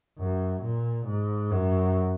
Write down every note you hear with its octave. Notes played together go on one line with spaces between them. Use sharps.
F#2
A#2
G#2
F#2